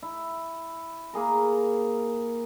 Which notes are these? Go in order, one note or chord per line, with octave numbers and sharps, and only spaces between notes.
E4
A#3 G#4 A#4